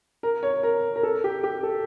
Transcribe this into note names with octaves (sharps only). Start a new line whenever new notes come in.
A#4
C#5
A#4
A#4
A4
G4
G4
A4